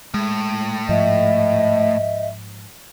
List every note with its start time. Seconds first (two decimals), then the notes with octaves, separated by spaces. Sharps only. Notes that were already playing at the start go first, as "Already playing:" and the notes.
0.14 A2 G#3
0.89 G#2 F3 D#5 E5